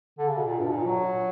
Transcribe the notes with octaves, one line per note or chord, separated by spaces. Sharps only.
D3
C#3
B2
A#2
G2
B2
A#2
F#3